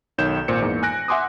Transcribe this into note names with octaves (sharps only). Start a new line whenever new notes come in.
B1 D#3 C#5 G6 E7
G#1 A#2 C5 C#7
E2 G#2 A#3
G#5 F#6 A#6 D7
E5 F#5 G#5 C6 D6 D#6